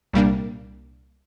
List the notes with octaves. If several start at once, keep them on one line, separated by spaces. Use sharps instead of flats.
C2 A#2 G3 A#3 D4